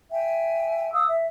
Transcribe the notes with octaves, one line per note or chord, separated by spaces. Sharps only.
E5 G5 G#5
F5 D#6 E6
E5